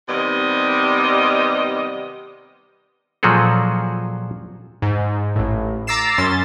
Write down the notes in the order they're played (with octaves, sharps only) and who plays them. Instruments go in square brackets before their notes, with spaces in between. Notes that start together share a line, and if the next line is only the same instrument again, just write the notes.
[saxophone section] C3 D#3 G3 B3 D#5
[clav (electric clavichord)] A#2 F3 F#3 F#4 G#4 A4
[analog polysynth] G#2
A1 A2
A#5 D6 E6 A6 C7 E7
F#2 C#4 C6 A6